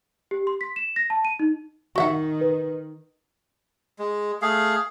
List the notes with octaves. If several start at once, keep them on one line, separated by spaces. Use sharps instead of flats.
G4
C6
B6
E7
A#6
A5
D#7
D#4
D#3 F#4 E5 F#5
B4
G#3
A3 G#4 F5